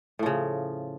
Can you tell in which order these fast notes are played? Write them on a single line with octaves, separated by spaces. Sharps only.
A2 F3 C#3